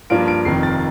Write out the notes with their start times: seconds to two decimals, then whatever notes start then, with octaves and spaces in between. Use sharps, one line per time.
0.10 G2 F3 A#3 D4 F4 D7
0.28 D7
0.45 F1 F2 D#3 C7
0.63 A6